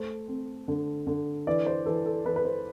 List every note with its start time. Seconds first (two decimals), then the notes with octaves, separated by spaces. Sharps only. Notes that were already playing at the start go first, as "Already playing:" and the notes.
Already playing: A3 C5
0.28 C4
0.68 D3
1.07 D3
1.47 E3 D5
1.66 C5
1.86 E3 A4
2.06 A4
2.25 E3 B4
2.36 B4
2.45 C5